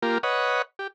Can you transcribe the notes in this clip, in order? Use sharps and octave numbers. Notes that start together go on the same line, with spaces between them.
A#3 F4 G4 A#4
B4 C#5 D#5 F#5
G4